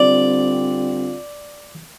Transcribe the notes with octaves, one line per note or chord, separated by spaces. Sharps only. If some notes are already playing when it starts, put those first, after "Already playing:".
Already playing: D3 G3 C4 F4 D5